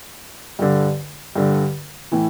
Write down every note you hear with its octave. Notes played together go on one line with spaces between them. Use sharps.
G2 D3
G2 D3
A2 E3